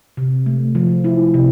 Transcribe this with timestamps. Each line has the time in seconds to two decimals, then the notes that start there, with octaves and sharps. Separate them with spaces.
0.17 C3
0.46 A3
0.75 F3
1.04 E4
1.34 C3